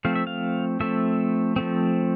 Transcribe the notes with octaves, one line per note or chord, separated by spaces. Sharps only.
F3 A3 C4 F5
E5
F5
F3 A3 C4 E5
F3 A3 C4